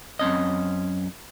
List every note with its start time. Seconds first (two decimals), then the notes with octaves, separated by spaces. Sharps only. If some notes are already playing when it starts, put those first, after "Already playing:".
0.19 F#2 C4 C#4 D#5